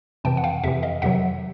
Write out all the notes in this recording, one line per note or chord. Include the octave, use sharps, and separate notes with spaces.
F2 C3 E3 G5 A5
F#5
F5 G5
F2 C3 E3 E5 F#5
D#5 F5
F2 C3 D#3 F#3 E5 F#5